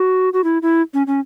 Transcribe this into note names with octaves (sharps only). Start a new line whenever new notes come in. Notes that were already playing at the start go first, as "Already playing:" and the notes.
Already playing: F#4
F#4
E4
E4
C#4
C#4